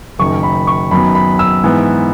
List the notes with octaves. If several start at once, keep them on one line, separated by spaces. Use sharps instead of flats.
F#1 F#2 D#3 C#6
B5
C#6
F#2 D#3 F#3 B3 B5
B5
E6
G#2 E3 B3